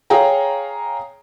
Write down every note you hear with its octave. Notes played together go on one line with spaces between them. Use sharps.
G#4 C#5 F5 G5 A#5